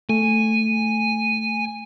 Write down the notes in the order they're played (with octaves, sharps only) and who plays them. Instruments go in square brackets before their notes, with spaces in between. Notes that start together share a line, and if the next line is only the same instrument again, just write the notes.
[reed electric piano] A3 [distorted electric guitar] G#5